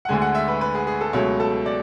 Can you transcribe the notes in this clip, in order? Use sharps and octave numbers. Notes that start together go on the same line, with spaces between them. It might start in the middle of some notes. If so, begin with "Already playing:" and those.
F#5
D2 D3 G#3 G#5
F#5
E5
B4
B4
G#4
G#4
A4
C#2 B2 F#3 A3 C#5
A4
D5